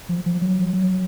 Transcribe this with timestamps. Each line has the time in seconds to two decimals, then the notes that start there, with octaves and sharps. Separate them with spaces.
0.09 F3
0.26 F3
0.42 F#3
0.73 F#3